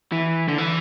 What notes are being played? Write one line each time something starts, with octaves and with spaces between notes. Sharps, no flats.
E3
D3
E3